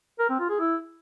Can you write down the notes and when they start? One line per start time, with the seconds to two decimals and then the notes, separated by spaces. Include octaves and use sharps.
0.19 A#4
0.29 C4
0.39 F4
0.50 G#4
0.60 E4